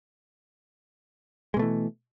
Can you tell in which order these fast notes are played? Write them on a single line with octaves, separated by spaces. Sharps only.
G#3 B2 A3 E3